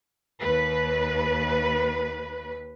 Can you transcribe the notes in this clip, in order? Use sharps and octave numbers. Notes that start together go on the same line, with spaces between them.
D#2 B4